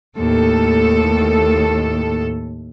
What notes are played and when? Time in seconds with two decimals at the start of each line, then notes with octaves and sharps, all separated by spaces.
0.16 D#2 A2 A4